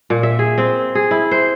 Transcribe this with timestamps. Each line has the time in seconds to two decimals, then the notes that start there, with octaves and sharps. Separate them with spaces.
0.10 A#2
0.23 E5
0.39 G#4
0.58 C4
0.95 G#4
1.11 E4
1.31 C5